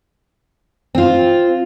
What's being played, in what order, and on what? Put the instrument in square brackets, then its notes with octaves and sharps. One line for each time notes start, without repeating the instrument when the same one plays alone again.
[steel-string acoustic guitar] C4 F4